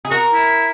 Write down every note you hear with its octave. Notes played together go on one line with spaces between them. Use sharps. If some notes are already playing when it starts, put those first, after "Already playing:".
G#4
F#4 A#4
E4